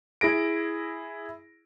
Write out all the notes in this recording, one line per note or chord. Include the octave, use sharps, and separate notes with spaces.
E4 G#4 A#6 D7